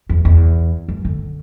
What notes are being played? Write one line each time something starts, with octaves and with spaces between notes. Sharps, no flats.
E2
E2
F#2
D3